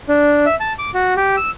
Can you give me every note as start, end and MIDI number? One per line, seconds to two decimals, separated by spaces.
0.09 0.45 62
0.46 0.55 76
0.60 0.73 81
0.79 0.90 86
0.94 1.14 66
1.17 1.36 67
1.37 1.50 88